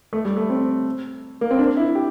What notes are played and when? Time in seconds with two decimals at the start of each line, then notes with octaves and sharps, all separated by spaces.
0.13 A3
0.25 G3
0.37 A3
0.50 C4
1.41 A#3
1.51 C4
1.59 D4
1.77 E4
1.95 G4